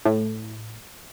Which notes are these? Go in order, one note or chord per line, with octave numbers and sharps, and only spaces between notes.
A2